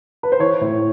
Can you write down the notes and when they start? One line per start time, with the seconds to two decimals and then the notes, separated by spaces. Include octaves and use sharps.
0.23 B4
0.32 C5
0.39 E3 C#5
0.61 A2